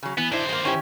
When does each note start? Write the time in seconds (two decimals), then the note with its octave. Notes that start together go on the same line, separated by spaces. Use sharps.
0.03 C#3 F#3
0.18 E3 B3
0.32 D#3 D4 E4 C5
0.49 G#3 A#3
0.65 C#4 E4 G4